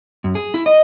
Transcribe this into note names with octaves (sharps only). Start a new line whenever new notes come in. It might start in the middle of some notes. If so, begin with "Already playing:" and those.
F#2
G#4
E4
D#5